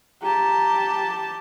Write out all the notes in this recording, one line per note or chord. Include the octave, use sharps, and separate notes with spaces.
G4 A5 A#5